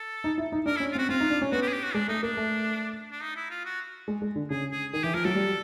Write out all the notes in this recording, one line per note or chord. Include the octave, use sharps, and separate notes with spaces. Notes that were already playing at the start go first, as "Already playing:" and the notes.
Already playing: A4
D#4
E4
D#4
D4 A#4
E4
C#4
F4
C4
F#4
C4 F4
D#4
D4
C#4
B3 F#4
G4
G#4
G4
F#4
G#3 D4
A3 D#4
A#3 D4
A3
D4
D#4
E4
F4
F#4
G#3
G#3
D3
C#3 G#4
G#4
D#3 G#4
E3 G4
F3 A#4
F#3 A4
G3